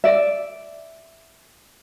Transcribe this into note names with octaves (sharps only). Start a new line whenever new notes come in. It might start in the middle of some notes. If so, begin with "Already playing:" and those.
D5 E5